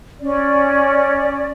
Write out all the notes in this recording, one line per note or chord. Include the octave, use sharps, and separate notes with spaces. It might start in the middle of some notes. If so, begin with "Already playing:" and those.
C#4 D5